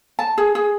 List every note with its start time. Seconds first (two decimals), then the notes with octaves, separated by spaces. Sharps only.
0.19 A5
0.38 G#4
0.55 G#4